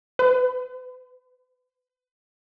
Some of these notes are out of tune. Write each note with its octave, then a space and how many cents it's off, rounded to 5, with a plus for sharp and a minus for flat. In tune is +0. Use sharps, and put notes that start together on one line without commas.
B4 +45